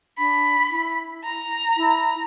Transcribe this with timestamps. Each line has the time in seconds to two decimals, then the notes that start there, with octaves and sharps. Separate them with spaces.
0.19 D4 B5
0.71 E4
1.24 A#5
1.77 E4